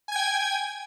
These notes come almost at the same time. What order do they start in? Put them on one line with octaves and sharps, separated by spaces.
G#5 G#6 G5